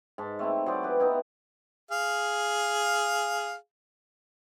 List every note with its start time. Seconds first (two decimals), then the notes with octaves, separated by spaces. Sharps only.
0.18 G#2 A5
0.39 A3 C4 E4
0.66 F#3 G#4 C5 D5
0.83 G4 B4
1.00 B3 D#4 E4
1.91 G#4 F5